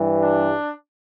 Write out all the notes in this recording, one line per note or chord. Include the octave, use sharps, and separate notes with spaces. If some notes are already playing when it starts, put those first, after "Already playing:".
Already playing: G2 E3 G3
D4